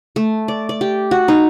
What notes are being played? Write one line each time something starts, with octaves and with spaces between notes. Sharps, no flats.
A3
D5
D5
G4
F#4
D#4